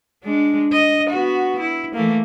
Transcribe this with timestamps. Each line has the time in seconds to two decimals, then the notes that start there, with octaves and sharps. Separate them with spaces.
0.24 G#3 D4
0.72 D#5
1.10 B3 F#4
1.60 E4
1.93 E3 A3 A#3